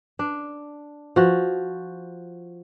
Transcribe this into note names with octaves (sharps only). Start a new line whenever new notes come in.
D4
F3 F#4